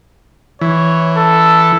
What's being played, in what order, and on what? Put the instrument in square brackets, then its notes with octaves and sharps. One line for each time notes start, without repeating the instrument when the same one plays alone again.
[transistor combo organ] E3 [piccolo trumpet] C#5
[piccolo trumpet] A4